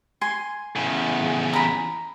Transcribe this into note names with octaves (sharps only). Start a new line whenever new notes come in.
G#5 C6
E2 C#3
A#5 B5